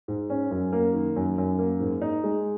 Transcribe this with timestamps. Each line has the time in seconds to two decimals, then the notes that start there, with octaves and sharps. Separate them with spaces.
0.08 G#2
0.30 C#4
0.51 F#2
0.73 A#3
0.93 D#3
1.16 F#2
1.38 F#2
1.59 A#3
1.80 G#2
2.02 D#4
2.24 G#3